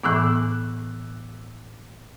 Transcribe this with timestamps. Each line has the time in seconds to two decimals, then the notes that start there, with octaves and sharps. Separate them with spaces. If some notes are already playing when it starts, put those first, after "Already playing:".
0.04 A2 E3 B3 D6 E6 F#6